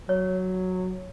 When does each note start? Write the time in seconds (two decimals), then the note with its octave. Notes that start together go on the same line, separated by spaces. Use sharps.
0.09 F#3 C#5